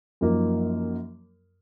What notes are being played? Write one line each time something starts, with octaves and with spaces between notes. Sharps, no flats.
F#2 F3 A#3 D#4